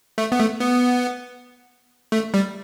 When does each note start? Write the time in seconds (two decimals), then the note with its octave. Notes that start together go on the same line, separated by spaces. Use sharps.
0.18 A3
0.32 B3
0.39 A3
0.61 B3
2.12 A3
2.34 G3